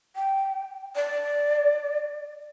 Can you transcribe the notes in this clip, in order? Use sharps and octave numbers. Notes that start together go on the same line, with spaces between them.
G5
D5